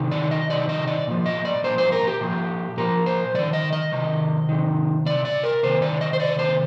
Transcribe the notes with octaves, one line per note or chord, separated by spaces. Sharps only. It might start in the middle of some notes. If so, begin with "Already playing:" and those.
Already playing: C3 D#3
D5
D#5
C3 D#3 D5
D#5
D5
A#2 F3
D#5
D5
A#2 F3 C5
C5
A#4
G4
A#2 F3
A#2 F3 A#4
C5
C3 D#3 D5
D#5
D#5
C3 D#3
C3 D#3
C3 D#3 D5
D5
A#4
C3 D#3 C5
D5
D#5
C5
C3 D#3 D5
C5